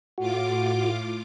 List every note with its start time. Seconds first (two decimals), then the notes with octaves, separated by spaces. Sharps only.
0.18 A2 F4 F#4 D6